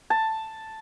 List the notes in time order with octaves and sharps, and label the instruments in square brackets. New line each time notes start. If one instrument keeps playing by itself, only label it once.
[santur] A5